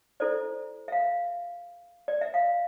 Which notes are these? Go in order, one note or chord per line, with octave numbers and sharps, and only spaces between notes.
E4 A4 C5 D5
E5
F5
D5
E5
F5